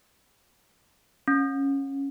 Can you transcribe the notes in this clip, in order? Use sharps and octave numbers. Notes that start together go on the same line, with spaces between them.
C#4